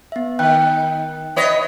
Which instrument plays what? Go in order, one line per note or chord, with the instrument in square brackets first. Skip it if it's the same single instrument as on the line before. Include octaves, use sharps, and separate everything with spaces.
[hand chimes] B3 E5
[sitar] D#3 [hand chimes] G5 F#6
[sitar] B3 C#5 D#5 [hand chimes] E5